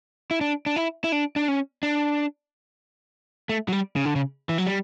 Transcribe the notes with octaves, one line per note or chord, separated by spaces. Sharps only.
E4
D4
D4
E4
E4
D4
D4
C#4
D4
A3
F#3
G3
C#3
D3
C#3
E3
F#3
G3